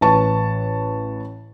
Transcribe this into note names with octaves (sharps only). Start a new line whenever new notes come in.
A1 B4 A5 C#6